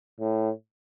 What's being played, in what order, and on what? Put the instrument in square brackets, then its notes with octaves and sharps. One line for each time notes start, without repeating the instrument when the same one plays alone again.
[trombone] A2